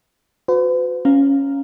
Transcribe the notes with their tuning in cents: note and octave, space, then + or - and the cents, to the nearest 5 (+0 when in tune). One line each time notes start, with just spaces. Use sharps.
F#4 -30 B4 +45
C#4 +0 F5 +0 A#5 +0